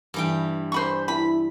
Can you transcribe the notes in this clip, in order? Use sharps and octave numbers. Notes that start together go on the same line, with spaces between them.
G2 E3 G5
C5 B5 C#6
E4 B5